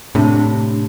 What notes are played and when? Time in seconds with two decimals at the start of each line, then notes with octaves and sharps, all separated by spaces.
0.15 A2 C3 D4